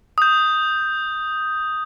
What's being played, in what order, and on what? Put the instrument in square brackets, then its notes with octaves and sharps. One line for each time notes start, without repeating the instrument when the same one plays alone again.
[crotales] D#6 G6